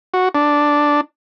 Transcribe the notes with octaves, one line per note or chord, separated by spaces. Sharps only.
F#4
D4